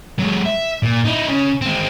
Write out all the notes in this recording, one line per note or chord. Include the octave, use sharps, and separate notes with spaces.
F#3 G#3
E5
A#2
D#4 E4
C#3
G#3 C4